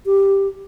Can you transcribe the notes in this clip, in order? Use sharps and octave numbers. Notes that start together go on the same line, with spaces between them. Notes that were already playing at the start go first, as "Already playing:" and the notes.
G4